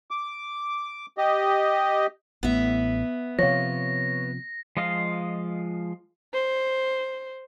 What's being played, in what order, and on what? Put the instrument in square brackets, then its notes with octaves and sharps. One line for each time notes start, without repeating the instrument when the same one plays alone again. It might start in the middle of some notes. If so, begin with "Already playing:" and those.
[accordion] D6
G4 D#5
[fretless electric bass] A1 A2 [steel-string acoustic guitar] B3 E5
[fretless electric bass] C3 F3 [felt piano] C#5 F5 [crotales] A#6
[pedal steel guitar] F3 G#3 F4 D#5 F5
[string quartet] C5